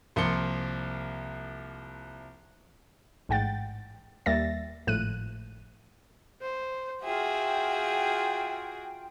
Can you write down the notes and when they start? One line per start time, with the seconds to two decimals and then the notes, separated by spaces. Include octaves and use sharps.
0.16 C2 F3 A#3 C6 C#7 G7
3.29 A1 G#2 F#5 G5 A6
4.26 D#2 G3 A#3 E5 A6 A#6
4.87 G#1 A2 F3 F#6 D#7
6.41 C5
7.04 F4 F#4 G#4 E5 G5